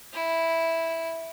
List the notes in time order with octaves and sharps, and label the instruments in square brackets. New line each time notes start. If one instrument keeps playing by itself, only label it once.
[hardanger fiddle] E4